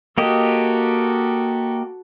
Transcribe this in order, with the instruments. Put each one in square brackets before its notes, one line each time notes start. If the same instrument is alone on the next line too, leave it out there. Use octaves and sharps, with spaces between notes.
[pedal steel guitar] A#3 G4 D#5 [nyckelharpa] F#4 A4